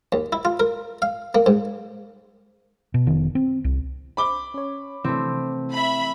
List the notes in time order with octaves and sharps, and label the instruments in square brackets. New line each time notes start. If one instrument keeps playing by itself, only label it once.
[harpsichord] D#2
E4
F4
A#4
F5
A#3
G#2
[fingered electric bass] B2
F1 D#3 B3
C4
C2
[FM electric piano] C5 [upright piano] B5 D6 G7
[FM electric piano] C#4 C#5
[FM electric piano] C3 E3 [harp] A3 C4
[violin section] E5 B5